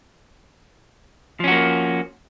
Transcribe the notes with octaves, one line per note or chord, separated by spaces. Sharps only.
F3 A#3 C#4 F#4